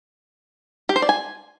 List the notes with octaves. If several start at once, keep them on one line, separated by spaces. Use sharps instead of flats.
G4
C5
D5
G#5